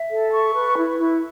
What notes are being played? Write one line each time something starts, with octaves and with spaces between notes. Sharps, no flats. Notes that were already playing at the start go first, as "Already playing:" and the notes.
Already playing: E5
A4
C#6
B4
E4
E4